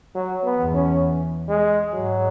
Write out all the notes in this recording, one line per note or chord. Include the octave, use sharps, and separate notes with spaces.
F#3
B3
E2
C#4
G#3
G#2 F#3